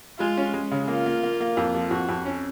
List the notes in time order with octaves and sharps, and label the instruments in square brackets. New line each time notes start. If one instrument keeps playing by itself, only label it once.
[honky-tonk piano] G#3 [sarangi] F4
[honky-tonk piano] C#4
G#3
C#3
[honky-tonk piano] A#3 [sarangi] F4
[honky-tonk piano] A#3
A#3
A#3
F2
F3
[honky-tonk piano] F2 [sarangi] F#4
[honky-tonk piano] F2
C#4